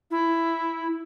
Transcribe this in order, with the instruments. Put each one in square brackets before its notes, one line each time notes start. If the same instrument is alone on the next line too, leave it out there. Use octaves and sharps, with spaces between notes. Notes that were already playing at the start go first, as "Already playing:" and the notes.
[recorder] E4